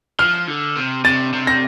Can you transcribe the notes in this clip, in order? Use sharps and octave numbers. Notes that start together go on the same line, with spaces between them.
F3 F6
D3
C3
C3 A6
C3
A#6